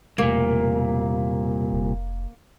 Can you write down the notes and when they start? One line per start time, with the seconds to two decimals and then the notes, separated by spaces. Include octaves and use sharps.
0.18 E1 C2 A#2 A3 A#3
1.72 F1